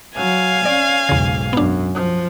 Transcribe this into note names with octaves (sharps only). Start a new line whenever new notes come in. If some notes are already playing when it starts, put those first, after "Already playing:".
F#3 F5 G#5
C#4 D5
B1 E2 G#2 C#3
F#2 B3 D4
F3